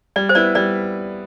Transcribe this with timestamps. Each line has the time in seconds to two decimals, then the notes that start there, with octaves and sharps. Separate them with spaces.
0.16 G3 D5
0.29 C5
0.35 B3 E4 B4 D5
0.55 G3 D5